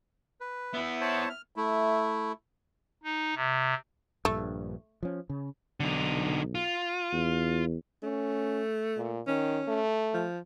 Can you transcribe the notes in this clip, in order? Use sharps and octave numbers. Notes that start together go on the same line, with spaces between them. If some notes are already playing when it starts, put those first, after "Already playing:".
B4
B3 E4 E5
C5 C#5 A5
F6
A3 E4
D#4
C3
A#1 G2 A3
F3 C#4
C#3
B1 D3 D#4
F4
E2
A3 C#4
A#2
D#3 C#4
A3
F3